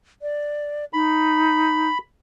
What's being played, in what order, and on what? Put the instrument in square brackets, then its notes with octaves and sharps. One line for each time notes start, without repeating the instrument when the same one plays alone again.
[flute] D5
[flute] D#4 [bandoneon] B5